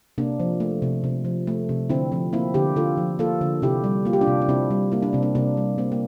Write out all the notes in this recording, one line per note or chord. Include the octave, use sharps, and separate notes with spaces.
C3 A#3 D4
F3
A3
C3
C3
F3
A3
C3
D3 C4 E4
F3 C4
A#3 C4 E4
D3 E4 G4
D3 F4 A4
F3
A#3 F4 A4
D3
C3 E4 G4
G3
A#3 F4
G4
D4 F4
C3
D4
C3 C4 E4
G3
A#3 E4
D4
C3 C4
A#3 D4
C3 A#3 D4
G3
A#3 C4
A#3